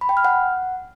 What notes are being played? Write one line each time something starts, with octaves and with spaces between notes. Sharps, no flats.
B5
G5
F6
F#5